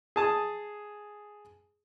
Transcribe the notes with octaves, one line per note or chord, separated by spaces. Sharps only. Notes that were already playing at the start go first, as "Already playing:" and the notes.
G#4 A5 D#6